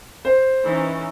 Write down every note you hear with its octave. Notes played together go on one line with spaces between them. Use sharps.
C5
E3 C#4 D#4